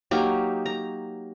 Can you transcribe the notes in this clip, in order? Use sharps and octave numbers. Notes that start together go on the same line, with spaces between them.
F#3 A#3 D#4 G4
A#5